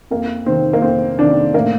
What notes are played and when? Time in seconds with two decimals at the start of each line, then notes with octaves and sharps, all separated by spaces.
0.11 F2 A#3
0.46 C3 D#3 C4
0.73 A#3
0.82 F2 C4
1.19 C3 D#3 D4
1.54 A2 A#3